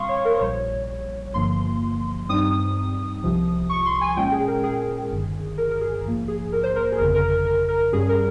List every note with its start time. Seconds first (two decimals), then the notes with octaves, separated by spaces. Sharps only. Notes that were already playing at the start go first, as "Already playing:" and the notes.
Already playing: A#2 G3 C4 F5 C6 C#6 D#6
0.09 C#5
0.25 A#4
0.36 C5
0.40 A#1 A#2 G3 C#5
1.34 G1 G2 F3 A#3 C6
2.29 G2 G3 C4 D#4 D#6
3.23 C2 C3 F3
3.69 C#6
3.86 C6
4.01 G#5
4.16 A#2 G#3 C#4 G5
4.32 G#4
4.47 A#4
4.64 G#4
5.10 G1 G2 D#3
5.58 A#4
5.71 A#4
5.81 G#4
6.04 A#1 G#2 F3 A#3
6.28 G#4
6.52 A#4
6.63 C5
6.76 A#4
6.92 G#4
6.98 G1 F2 C#3 A#4
7.14 A#4
7.30 A#4
7.45 A#4
7.69 A#4
7.92 G2 G3 C#4 G#4
8.09 A#4